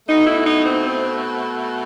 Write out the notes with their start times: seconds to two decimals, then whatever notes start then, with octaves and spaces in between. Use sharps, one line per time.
0.07 B2 A3 D#4
0.26 E4
0.44 D#4
0.63 C4
0.81 C4